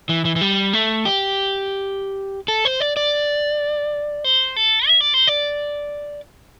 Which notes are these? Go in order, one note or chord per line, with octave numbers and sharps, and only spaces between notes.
E3
E3
E3
G3
A3
G4
A4
C5
D5
D5
C5
A4
E5
D5
C5
D5